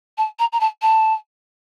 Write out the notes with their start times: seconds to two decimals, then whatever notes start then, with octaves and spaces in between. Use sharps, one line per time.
0.17 A5
0.39 A#5
0.52 A#5
0.60 A5
0.82 A5